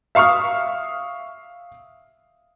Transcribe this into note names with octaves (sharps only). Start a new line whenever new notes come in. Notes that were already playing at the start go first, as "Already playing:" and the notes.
E5 F5 C#6 D#6 F6